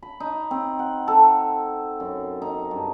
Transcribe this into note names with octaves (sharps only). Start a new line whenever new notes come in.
B5
D#4
C4
F#5
A4
F#2
D#4
G2